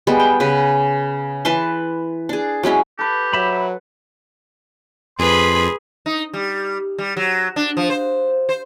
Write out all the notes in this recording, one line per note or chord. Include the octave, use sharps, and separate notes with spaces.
G3 G#3 B3
G5
C#3 B4
E3 B4 A5 C6
D4 G#4
F#3 G#3 C#4 E4
G4 A4 B4
F#3 E5 B5
F2 G#4 B4 B5 C6
D#4
G3
G3
F#3
D4
F3
C5
C5